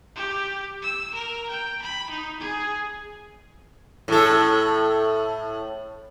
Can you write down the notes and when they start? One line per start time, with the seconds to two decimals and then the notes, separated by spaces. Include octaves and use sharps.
0.16 G4
0.82 E6
1.14 A#4
1.50 G5
1.82 B5
2.10 D#4
2.40 G#4
4.08 A2 A4